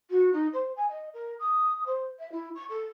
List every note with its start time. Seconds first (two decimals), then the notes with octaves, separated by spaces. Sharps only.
0.10 F#4
0.33 D#4
0.53 C5
0.76 G#5
0.89 D#5
1.13 A#4
1.39 D#6
1.86 C5
2.19 E5
2.32 E4
2.55 C#6
2.69 A4